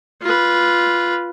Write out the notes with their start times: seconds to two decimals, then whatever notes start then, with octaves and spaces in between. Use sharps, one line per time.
0.22 F4 B4